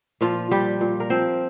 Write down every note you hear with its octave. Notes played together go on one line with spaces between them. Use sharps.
A#2 F3 F4
F3 G3 G4
A#2
A#4
F3 C4 C5